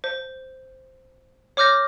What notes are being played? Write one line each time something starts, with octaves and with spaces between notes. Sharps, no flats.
C5
C#5 D6 F6 G6 A#6